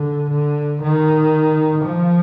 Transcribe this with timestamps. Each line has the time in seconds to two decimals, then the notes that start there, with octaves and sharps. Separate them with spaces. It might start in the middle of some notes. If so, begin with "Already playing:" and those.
Already playing: D3
0.31 D3
0.82 D#3
1.85 F3